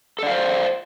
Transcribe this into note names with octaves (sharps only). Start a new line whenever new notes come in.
A4 C5 D5 F5